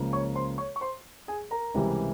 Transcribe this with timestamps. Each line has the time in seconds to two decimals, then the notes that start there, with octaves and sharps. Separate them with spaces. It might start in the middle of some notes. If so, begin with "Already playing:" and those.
Already playing: C#2 C#3 F3 A#3
0.13 C#5 C#6
0.35 C5 C6
0.58 C#5 C#6
0.76 C#6
0.81 C5 C6
1.28 G#4 G#5
1.51 A#4 A#5
1.74 C#2 C3 E3 G3